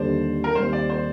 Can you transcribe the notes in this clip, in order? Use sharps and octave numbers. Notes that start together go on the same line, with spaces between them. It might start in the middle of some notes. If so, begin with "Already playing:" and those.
Already playing: D#2 D3 G3 D4 C5 D5
A#4
D#2 D#3 G3 C4 C5
D5
C5